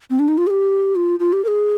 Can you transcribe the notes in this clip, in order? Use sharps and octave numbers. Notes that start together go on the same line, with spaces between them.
C4
D4
D#4
F4
G#4
G4
F4
F4
G4
A#4
G#4